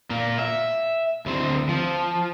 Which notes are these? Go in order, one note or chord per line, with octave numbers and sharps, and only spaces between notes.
A#2 A#3
E5
D2 C4
F3